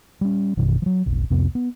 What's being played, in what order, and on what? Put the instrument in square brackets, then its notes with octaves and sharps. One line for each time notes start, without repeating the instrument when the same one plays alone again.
[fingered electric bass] G3 C#4
A1 F#2 B2 D#3
F3 F#3
F1 B1
C2 F2 C3 B3
B3